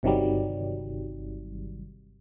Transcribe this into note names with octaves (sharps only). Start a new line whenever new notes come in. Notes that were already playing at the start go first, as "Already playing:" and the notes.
G1 C3 D#3 F#3 G3